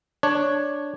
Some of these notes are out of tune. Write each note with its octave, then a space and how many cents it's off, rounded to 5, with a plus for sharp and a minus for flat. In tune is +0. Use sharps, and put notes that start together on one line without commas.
D4 +0 C#5 +0